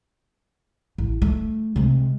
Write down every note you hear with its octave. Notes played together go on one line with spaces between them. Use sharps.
A1
A3
C3 G#3